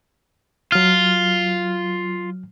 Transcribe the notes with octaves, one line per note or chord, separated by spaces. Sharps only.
F#3 F4 F6